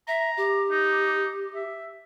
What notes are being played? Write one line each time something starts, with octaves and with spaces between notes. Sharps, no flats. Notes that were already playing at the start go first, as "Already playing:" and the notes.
E5 A#5
G4
D#4
E5